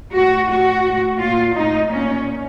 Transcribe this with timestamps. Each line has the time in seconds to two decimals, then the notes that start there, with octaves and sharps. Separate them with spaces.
0.14 A2 F#4
0.50 A2 F#4
0.85 A2
1.21 A#2 F4
1.57 A2 D#4
1.92 A#2 C#4